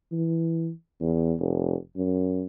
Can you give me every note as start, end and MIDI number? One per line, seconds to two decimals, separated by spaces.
0.12 0.71 52
1.01 1.34 40
1.39 1.75 29
1.96 2.46 42